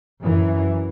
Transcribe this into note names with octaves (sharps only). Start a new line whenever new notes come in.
F#2 E3